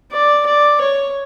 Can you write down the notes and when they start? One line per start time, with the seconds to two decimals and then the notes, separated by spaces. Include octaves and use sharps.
0.12 D5
0.46 D5
0.81 C#5